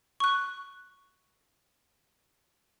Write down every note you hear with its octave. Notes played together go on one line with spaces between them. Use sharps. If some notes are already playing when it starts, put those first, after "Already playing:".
C#6 F#6